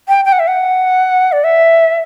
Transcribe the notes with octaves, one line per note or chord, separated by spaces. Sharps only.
G5
G5
F#5
E5
F#5
D5
E5